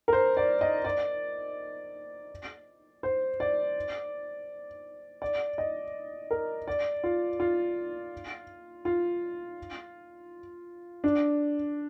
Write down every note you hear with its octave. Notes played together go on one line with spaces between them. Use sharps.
A#4
C5
D5
D#5
D5
C5
D5
D5
D#5
A#4
D5
F4
F4
F4
D4